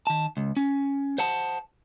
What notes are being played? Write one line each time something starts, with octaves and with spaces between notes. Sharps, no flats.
D#3 A5
C#2
C#4
C5 F#5 A5